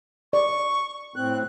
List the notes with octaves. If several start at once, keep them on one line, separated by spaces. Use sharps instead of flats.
D5 C#6
A2 C4 F#6